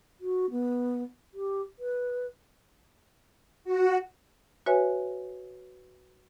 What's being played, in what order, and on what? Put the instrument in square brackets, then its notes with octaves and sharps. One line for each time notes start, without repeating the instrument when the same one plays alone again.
[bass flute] F#4
B3
G4
B4
[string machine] F#4
[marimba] F#4 B4 C#5 E5 G#5